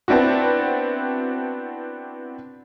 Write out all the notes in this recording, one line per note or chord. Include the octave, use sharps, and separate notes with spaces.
B3 C4 D4 E4 F#4